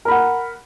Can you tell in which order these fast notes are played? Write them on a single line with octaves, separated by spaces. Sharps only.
A#4 B5 F#5